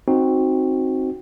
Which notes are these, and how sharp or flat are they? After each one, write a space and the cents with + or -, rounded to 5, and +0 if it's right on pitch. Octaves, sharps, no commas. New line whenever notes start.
C4 +10 D#4 +0 F#4 +0